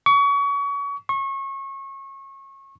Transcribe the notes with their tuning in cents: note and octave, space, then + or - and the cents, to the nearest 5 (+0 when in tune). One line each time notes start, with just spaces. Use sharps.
C#6 +30
C#6 -30